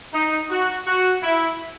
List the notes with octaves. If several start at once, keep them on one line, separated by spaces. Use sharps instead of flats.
D#4
F#4
F#4
E4